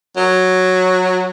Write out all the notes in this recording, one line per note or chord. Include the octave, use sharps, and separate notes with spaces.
F#3